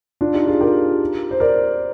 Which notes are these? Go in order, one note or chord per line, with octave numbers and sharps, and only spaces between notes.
D4 F4
D#4 G4
F4 G#4
G4 A#4
C5
A#4 D5